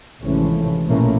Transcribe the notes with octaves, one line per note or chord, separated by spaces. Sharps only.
G#1 C3 E3 F3 A3 C#4
A#1 B2 E3 A3 A#3 C#4